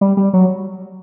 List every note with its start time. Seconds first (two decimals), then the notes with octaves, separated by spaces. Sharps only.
0.01 G3
0.17 G3
0.33 F#3